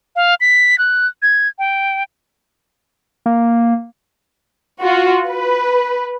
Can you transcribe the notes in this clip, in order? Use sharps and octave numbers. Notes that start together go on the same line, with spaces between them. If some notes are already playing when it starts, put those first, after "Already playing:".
F5
B6
F#6
G#6
G5
A#3
F4 F#4
B4